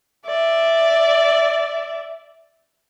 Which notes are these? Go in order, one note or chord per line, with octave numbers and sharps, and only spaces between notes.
D5 E5